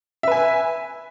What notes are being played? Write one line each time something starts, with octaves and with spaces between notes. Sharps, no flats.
B4 E5 G#5